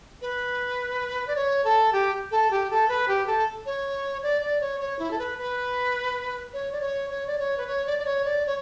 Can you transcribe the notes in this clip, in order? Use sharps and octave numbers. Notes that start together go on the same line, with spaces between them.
B4
D5
C#5
A4
G4
A4
G4
A4
B4
G4
A4
C#5
D5
D5
C#5
C#5
E4
A4
B4
B4
C#5
D5
C#5
C#5
D5
C#5
B4
C#5
D5
D5
C#5
D5
C#5